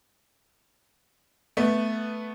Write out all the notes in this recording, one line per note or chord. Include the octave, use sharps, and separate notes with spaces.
A3 B3